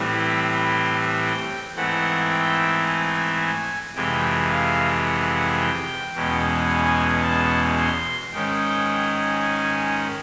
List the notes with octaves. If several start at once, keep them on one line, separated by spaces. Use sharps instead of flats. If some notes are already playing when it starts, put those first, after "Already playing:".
Already playing: A2 E3 G3 C4
B5
C6
G5
G#2 E3 A3 C4 F#5
G5
G#5
G#5
F2 C3 E3 G#3 G5
F5
F#5
G5
E2 B2 G#3 C#4
G#5
A5
C6
G#2 D#3 G#3 C#4 G5
G#5